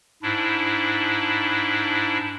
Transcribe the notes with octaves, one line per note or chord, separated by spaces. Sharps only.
G#2 D4 E4